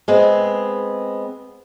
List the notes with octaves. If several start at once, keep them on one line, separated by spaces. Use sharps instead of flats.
G#3 B3 C4